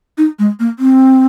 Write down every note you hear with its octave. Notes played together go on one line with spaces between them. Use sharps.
D#4
G#3
A#3
C4